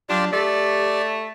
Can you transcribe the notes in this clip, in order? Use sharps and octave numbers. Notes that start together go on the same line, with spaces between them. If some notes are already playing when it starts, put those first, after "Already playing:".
F#3 D4 F4 G4 D5
A3 G4 D5